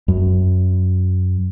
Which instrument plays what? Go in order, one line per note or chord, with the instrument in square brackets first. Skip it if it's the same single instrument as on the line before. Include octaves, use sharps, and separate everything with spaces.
[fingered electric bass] F#2